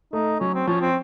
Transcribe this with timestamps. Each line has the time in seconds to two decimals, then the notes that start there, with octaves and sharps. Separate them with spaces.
0.13 A3 D#4
0.40 F#3 C#4
0.54 C4
0.67 F3 C#4
0.81 C4